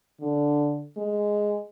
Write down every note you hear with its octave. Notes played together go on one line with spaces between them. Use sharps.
D3
G#3